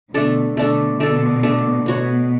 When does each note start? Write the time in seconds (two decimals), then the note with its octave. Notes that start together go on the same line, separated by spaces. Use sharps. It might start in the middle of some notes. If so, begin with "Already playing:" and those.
0.14 B2 D3 A3 D4 A4
0.57 B2 D3 A3 D4 A4
0.99 B2 D3 A3 D4 A4
1.43 A3 D4 A4
1.86 B2 B3 F#4 C#5